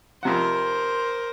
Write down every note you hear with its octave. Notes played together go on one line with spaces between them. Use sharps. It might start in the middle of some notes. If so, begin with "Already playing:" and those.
F2 C3 A#4 C5 F#5